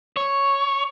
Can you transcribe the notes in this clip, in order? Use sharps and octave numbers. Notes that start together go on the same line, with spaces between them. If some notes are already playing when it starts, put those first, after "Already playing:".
C#5